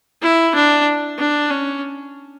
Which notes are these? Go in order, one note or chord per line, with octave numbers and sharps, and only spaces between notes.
E4
D4
D4
C#4